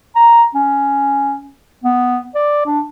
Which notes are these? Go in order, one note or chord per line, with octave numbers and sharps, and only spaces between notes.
A#5
C#4
B3
D5
D4